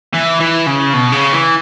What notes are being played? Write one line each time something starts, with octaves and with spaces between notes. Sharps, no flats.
E3
E3
C#3
B2
C#3
E3